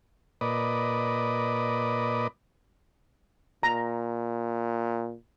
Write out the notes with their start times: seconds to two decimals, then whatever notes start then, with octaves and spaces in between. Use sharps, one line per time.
0.41 A#2 B4 D5 D#5
3.63 A#2 A#5